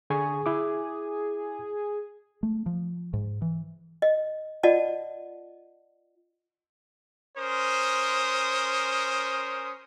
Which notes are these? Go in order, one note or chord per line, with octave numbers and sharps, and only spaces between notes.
D3 G#4 G#5 C#6
E4 D6
A3
F3
G#2
E3
D#5
F4 D5 D#5 F#5 A5
C#4 A#4 C5 D#6